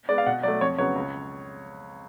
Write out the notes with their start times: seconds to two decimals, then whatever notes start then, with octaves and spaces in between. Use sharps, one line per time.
0.09 G#3 B3 D5
0.18 F5
0.26 B2 F#5
0.43 F#3 A3 D5
0.61 F2 C#5
0.78 C#3 F#3 B3 C#5
0.96 C#2